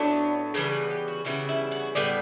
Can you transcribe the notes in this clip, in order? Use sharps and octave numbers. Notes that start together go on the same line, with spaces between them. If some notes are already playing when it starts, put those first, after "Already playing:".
Already playing: A2 F#3 B3 D4
C#3 E3 G3 B3 A4
B4
G4
F#4
C#3 E3 G3 B3 E4
E4
F#4
A2 G3 B3 D5